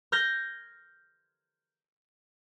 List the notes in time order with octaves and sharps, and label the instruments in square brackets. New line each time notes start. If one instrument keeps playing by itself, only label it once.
[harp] F6 G6 G#6 A#6